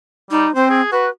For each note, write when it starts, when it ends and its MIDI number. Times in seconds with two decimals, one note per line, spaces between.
0.31 0.47 55
0.31 0.53 63
0.55 0.81 60
0.55 0.70 72
0.70 0.89 68
0.92 1.07 66
0.92 1.10 71